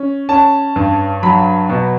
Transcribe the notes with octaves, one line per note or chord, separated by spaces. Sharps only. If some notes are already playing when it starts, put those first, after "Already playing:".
Already playing: C#4
C#4 A5
G2
F#3 B5
B2